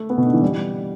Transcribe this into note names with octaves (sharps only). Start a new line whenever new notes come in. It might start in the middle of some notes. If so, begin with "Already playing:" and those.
Already playing: A3
B3
B2
D3
E3
G3